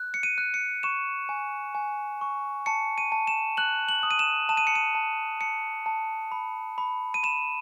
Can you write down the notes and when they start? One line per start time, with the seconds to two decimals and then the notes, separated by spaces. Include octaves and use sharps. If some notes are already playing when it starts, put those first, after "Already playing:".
Already playing: F#6
0.14 C#7
0.23 D#7
0.38 F#6
0.54 C#7
0.83 C#6 E7
1.29 G#5
1.75 G#5
2.21 C#6
2.66 A5 C#7
2.98 D#7
3.12 A5
3.27 E7
3.57 F#6 F#7
3.89 F#7
4.03 D#6
4.11 D#7
4.19 E7
4.49 A5 E7
4.57 D#7
4.67 C#7
4.75 D#7
4.95 A5
5.41 A5 C#7
5.86 A5
6.32 B5
6.78 B5
7.14 D#7
7.23 B5 E7